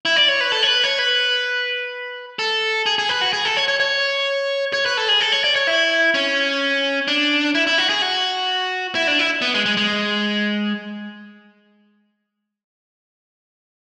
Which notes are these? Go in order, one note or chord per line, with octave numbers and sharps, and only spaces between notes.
E4
D5
C#5
B4
A4
C#5
B4
C#5
B4
A4
G#4
G#4
B4
F#4
G#4
A4
C#5
C#5
C#5
C#5
B4
A4
G#4
A4
C#5
D5
C#5
E4
C#4
D4
E4
E4
F#4
G#4
F#4
E4
D4
E4
B3
G#3
G#3
G#3